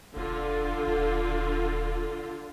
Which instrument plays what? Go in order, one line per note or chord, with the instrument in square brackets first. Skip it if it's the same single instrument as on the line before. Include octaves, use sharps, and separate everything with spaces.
[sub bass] E1 [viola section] D3 F4
[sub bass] D#1